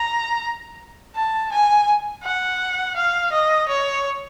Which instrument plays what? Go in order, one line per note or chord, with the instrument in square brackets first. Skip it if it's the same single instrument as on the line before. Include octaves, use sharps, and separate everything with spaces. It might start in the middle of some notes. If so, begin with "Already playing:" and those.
Already playing: [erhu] A#5
A5
G#5
F#5
F5
D#5
C#5